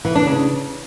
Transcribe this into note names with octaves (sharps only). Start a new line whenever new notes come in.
E3
D4
C#3